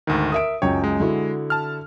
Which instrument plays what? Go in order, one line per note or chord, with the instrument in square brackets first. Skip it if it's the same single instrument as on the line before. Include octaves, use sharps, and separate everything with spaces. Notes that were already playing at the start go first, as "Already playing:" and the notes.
[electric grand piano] D2 G#2 D#3
[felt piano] A#4 E5 D7 [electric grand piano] D#6
[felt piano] C#2 F#2 G5 [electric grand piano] C#5
[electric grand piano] G#3
[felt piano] D3 E4 F#4
[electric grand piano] A5 F6